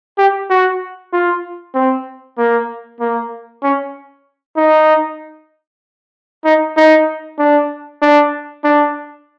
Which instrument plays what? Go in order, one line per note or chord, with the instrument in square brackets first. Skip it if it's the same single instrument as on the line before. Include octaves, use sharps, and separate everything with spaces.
[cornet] G4
F#4
F4
C4
A#3
A#3
C#4
D#4
D#4
D#4
D4
D4
D4